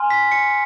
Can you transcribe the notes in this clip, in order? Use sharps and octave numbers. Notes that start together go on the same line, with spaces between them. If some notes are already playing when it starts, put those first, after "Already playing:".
Already playing: G#5 C6 F6
B6
C#7